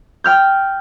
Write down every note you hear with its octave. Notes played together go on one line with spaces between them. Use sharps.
G5 F6 G6